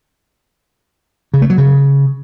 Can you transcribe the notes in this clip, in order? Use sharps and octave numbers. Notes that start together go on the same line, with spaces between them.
C#3
A3
F#3
C#3